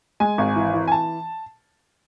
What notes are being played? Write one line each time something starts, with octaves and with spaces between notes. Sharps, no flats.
G#3 G#5
G#1
E3
E3
G#5
A5